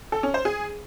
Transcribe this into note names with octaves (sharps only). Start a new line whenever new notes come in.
A4
C#4
C5
G#4